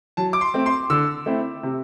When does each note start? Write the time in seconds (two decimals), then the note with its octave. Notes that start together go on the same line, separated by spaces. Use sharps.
0.17 F#3 A5
0.33 D6
0.41 C6
0.54 A3 C4
0.66 C6
0.90 D3 E6
1.26 A3 C4 E4
1.63 C3